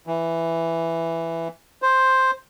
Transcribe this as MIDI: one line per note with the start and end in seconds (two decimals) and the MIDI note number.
0.07 1.48 52
1.82 2.31 72